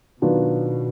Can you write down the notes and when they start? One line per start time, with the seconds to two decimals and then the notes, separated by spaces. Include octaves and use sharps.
0.21 B2 D#3 F#3 B3 D4 F4